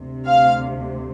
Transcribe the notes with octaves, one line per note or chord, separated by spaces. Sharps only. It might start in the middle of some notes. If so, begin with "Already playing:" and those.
Already playing: D2 C3
F5